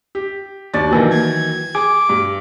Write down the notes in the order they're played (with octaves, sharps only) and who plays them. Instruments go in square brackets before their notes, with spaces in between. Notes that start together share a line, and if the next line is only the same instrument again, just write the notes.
[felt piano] G4
D#2 D4 A6
[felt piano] D#3 E3 F#3 [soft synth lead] A#3
[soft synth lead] G#6
[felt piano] G#4 [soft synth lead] D6
[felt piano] G2